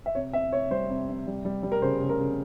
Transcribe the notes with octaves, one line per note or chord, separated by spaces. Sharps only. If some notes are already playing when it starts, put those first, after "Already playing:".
E5
C3 C#5
C3 E5
C3 C#5
G3 C5
C3
C3
G3
G3
G3
A#4
C#3 C5
C#3
A#4
C#3